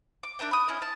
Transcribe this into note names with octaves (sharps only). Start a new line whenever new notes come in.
D6
D4 A#4 E5 G5
B5 D#6
C#4 E4 D#5
A5